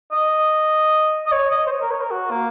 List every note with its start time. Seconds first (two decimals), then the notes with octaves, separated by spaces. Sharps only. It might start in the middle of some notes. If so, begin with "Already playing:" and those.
0.12 D#5
1.26 D#5
1.32 C#5
1.51 D#5
1.67 C5
1.71 C#5
1.81 A#4
1.91 C#5
2.01 A#4
2.11 F#4
2.31 A#3